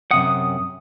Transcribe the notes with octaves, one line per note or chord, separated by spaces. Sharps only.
F#2 C3 F#5 D#6